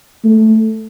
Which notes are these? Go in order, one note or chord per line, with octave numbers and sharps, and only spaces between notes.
A3